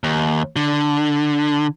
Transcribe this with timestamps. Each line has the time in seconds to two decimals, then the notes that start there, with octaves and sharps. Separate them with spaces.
0.04 D#2
0.56 D3